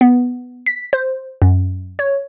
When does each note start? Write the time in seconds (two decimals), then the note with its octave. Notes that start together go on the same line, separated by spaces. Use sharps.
0.01 B3
0.66 B6
0.93 C5
1.42 F#2
1.99 C#5